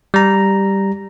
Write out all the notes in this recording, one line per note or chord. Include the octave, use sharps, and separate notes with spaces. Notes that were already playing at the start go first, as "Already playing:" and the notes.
G3 A#5